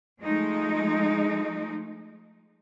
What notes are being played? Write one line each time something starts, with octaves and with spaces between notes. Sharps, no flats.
F3 G#3 A3 D#4